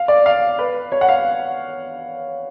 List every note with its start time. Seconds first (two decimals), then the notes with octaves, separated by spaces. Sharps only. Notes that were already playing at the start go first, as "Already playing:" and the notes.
Already playing: F5
0.08 D5
0.26 F5
0.59 B4
0.92 C#5
1.01 F#5
1.09 F5